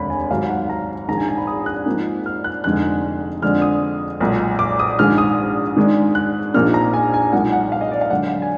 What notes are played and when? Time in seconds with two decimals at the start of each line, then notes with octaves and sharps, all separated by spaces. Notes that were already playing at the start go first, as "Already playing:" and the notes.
Already playing: F1 D#2 D3 G#3 B5
0.10 G#5
0.30 G#1 G#2 D#3 F#3 F5
0.49 F#5
0.70 A#5
1.08 A#1 G#2 D#3 A#5
1.18 G#5
1.28 G#5
1.37 B5
1.47 D#6
1.66 F#6
1.86 G#2 F3 A#3 D#4
2.26 F6
2.44 F#6
2.64 F1 F2 D3 G#3 D#4 F#6
3.42 F2 D3 G#3 D4 F6
3.62 D#6
4.20 B1 A#2 G#3
4.59 D6
4.79 D#6
4.99 A#1 G#2 D#3 G#3 F6
5.18 D#6
5.76 G#2 D#3 G#3 D4
6.15 F#6
6.54 A#1 A#2 F3 A#3 D#4 F6
6.74 A#5
6.93 G#5
7.14 G#5
7.32 B1 A#2 G#3 D#4 F#5
7.52 F#5
7.72 F5
7.81 D#5
7.91 D5
8.01 F5
8.10 F#2 D3 G#3 F#5
8.42 G#5